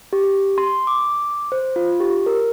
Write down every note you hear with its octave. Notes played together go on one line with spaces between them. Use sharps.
G4
G4
C6
D6
C5
F4
G4
A#4